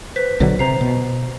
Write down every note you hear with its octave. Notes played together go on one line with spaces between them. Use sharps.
B4 C5 B6
A#1 D3 F#3
C3 C5 A#5 C7
B2